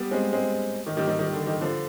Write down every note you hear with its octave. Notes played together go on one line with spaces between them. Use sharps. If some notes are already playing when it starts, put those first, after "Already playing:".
Already playing: G3 B3
G#3 C4
G#3 C4
D#3
D#3 G3
D#3 G3
D#3
D3
D#3
D3 F3